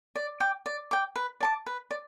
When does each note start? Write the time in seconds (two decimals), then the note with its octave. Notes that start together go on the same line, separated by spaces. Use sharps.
0.15 D5
0.40 G5 D6
0.66 D5
0.91 G5 D6
1.16 B4
1.41 D5 A5 D6
1.66 B4
1.91 D5